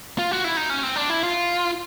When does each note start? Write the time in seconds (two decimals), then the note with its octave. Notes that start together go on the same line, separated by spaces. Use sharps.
0.19 F4
0.31 F#4
0.44 E4
0.57 D#4
0.70 C#4
0.83 C4
0.96 D4
1.10 E4
1.23 F4